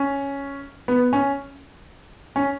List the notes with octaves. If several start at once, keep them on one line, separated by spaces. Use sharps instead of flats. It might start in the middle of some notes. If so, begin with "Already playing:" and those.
Already playing: C#4
B3
C#4
C#4